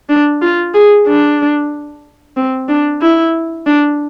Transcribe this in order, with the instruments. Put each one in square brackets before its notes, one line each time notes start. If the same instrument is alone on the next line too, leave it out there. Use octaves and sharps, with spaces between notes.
[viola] D4
F4
G#4
D4
C4
D4
E4
D4